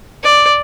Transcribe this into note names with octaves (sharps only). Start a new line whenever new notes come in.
D5